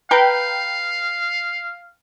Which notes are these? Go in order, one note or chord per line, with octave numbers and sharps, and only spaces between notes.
B4 F5 G5 A#5 G6